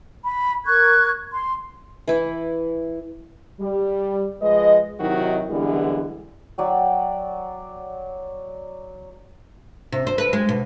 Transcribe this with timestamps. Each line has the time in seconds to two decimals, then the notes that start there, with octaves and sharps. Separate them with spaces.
0.24 B5
0.65 A#4 C#6 F#6 G#6
1.31 C6
2.08 E3 E4
3.60 G3
4.42 F3 G#3 B4 D#5
5.00 C3 D#3 F#3 D#4 E4 F#4
5.50 F#2 D3 E3 G3 G#3 B3
6.58 F#3 D5 G5
9.92 C3
10.07 C5
10.18 B4
10.33 G#3
10.49 B2